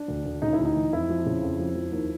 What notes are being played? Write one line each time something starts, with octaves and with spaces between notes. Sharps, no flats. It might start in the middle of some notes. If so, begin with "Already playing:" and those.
Already playing: D4
D2
D2
C#3 D#4
E4
D2
D#4
E3
F2 E4
F3
C#3
F2
F3
F3
D#2